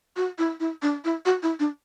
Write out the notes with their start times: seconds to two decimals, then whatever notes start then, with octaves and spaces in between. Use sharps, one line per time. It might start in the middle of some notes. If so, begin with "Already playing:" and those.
0.16 F#4
0.38 E4
0.60 E4
0.82 D4
1.05 E4
1.25 F#4
1.43 E4
1.60 D4